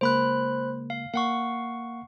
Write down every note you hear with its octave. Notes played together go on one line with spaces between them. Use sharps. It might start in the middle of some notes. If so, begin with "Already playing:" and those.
C#3 G#3 A#3 C5 B5 F#6
F5
A#3 F5 F#5 C#6